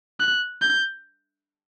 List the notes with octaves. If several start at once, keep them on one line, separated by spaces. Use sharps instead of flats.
F#6
G6